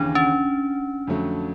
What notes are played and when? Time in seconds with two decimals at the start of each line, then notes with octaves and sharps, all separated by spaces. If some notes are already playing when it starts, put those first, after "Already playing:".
Already playing: D#2 C#3 E3 D4
0.15 C#4
1.07 F2 D3 F#3 A3